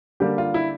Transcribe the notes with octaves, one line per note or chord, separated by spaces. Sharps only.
D3 G3 A#3 G4
F4
E4